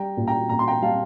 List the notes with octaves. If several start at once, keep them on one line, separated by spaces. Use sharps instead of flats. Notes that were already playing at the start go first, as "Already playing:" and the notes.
Already playing: G3 G5 A#5
A#2
G5 A#5
A#2 A#5
C6
G5 A#5
G3 F5 A5